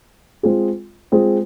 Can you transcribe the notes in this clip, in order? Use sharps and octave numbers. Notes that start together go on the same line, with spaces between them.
G#3 C4 F4 G#4
G#3 C4 F4 G#4